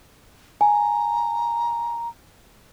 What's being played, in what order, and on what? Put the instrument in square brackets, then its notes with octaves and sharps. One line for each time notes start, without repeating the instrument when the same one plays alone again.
[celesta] G#5 [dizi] A#5